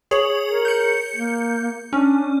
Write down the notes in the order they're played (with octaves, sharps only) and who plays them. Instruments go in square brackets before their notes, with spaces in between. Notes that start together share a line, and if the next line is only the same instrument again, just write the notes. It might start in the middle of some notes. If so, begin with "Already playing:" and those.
[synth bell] G#4 C#5 F#7
[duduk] A#4
[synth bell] G6 C#7
[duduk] A#3
[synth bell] C#4 [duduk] D4